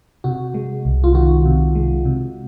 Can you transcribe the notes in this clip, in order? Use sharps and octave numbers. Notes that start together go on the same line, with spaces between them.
C3 F#4
G#3
C2
F4
D#3 F#4
C3
G#3
C3